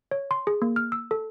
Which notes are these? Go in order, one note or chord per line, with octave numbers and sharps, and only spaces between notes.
C#5
C6
G#4
A#3
F6
E6
A4